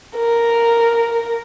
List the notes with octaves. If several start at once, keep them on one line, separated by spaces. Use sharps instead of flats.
A#4